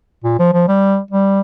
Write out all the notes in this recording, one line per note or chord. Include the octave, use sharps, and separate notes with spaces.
A#2
F3
F3
G3
G3